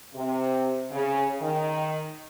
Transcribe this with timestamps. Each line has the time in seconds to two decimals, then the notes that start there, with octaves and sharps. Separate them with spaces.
0.14 C3
0.90 C#3
1.40 D#3